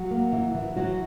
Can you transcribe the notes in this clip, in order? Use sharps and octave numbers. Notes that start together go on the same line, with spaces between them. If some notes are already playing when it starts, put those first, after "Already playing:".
Already playing: F#3 F#4
A#3
E3
E3
E3 F#3 F#4